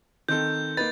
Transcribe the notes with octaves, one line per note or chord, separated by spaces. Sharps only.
D#3 C4 A4 G6
A#3 D#4 B4 A6